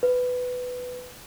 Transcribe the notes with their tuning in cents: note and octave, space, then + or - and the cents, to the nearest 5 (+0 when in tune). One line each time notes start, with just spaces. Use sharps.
B4 +10